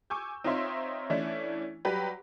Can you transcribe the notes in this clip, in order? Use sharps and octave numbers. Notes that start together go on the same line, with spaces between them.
G#5 C#6 D6 E6 G6
C4 D#4 F4 C#5 E5 C6
E3 A3 C#4 D4 E4
F#3 G3 G4 B4